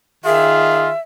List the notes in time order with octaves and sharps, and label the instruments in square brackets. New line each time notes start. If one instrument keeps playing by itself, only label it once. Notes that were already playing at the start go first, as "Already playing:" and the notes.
[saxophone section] D#3 G#4 [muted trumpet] F4 [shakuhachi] E5